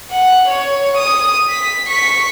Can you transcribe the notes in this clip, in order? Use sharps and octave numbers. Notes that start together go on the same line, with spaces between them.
F#5
C#5
D#6
B6
C#6 B6